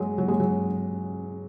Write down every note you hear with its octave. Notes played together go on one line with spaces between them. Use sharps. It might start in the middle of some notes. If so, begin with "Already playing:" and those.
Already playing: F#3 G#3
F#3
G#3
F#3